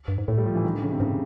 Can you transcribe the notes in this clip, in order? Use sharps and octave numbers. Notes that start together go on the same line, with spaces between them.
G2
G#2
A2 A3
G3
F3
E3
D#3
D3
C#3
C3
G#2 C#3